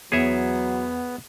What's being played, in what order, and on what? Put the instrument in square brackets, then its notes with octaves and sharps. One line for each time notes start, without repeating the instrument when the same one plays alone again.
[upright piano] E2 [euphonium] F#3 [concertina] B3 [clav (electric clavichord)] G#4 C#5 E5